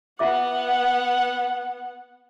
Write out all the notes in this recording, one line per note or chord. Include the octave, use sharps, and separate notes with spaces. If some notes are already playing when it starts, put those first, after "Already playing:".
B3 F4 E5 F#5 D6